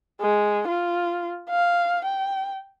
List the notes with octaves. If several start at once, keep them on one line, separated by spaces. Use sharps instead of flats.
G#3
F4
F5
G5